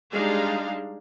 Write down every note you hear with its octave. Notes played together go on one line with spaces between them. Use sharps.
G3 G#3 D4 D#4 G#4 F5